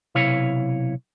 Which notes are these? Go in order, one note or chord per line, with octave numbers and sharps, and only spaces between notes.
B1 C3 E4 C#5 F5